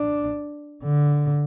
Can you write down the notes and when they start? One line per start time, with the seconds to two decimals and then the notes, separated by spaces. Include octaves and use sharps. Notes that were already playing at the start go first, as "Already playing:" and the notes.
Already playing: D4
0.84 D3